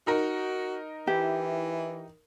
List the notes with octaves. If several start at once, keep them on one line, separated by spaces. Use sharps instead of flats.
D#4 F#4 A#4
E3 E4 G4